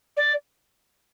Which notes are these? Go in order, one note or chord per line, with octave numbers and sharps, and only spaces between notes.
D5